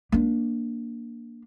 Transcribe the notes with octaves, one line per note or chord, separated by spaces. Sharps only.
A#3 D4